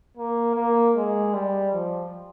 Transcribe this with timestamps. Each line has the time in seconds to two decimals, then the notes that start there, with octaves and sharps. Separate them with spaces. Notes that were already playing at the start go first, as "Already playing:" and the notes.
0.17 A#3
0.56 A#3
0.96 G#3
1.34 G3
1.74 F3